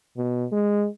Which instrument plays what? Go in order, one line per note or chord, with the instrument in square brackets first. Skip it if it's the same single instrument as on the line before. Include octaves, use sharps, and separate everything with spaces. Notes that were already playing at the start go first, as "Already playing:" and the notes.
[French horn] B2
G#3